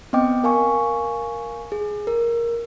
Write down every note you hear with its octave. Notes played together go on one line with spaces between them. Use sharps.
B3 C4 D#5 G5 D6
A#4 F5 G#5 C#6
G#4
A#4